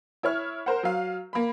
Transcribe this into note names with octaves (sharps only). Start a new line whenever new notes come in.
E4 C#5 F6
A#4 C5 F#5
F#3 F5
A#3 B5